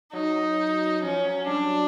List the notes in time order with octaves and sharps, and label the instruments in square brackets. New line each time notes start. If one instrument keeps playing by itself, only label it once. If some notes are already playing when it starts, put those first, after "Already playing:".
[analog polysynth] F#3 [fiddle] D#4
[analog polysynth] F3 [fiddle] C#4
[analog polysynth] F#3
[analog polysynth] G3 [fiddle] D4